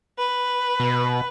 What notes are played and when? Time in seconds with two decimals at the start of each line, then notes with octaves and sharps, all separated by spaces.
0.18 B4
0.80 B2